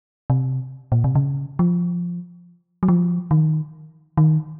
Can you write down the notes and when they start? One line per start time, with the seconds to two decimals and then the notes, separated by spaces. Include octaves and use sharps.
0.30 C3
0.92 A#2
1.04 C3
1.15 C#3
1.59 F3
2.83 F#3
2.88 F3
3.31 D#3
4.17 D#3